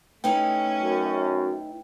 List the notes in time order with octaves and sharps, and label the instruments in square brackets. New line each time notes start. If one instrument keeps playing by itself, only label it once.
[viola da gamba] A3 C#4 [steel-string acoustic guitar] D#4 E4 D#5 [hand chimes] B4 G5
[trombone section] F#2